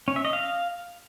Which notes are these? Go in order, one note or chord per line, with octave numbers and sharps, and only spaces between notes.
C#4
E5
D#5
F5